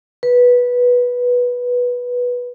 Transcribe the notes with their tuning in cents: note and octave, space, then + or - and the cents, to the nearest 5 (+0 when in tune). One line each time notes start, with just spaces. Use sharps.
B4 -10